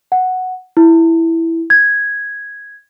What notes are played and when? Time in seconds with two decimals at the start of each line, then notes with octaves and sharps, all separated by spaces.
0.12 F#5
0.77 E4
1.70 G#6